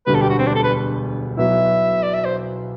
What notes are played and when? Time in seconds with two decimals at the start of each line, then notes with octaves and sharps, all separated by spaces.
0.06 E1 D2 D3 G3 B3 B4
0.14 A4
0.22 G4
0.30 F#4
0.39 C4
0.47 D4
0.55 A4
0.64 B4
1.37 B1 B2 F#3 B3 E4 E5
2.03 D5
2.14 E5
2.25 C5